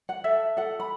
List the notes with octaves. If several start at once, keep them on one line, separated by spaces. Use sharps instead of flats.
F#5
A4 E5
A4 F#5
B5